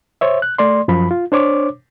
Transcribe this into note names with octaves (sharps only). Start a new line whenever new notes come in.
C5 C#5 E5
F#6
A3 D5 C6
F#2 F3 B5
F4
D4 C5 C#5 D6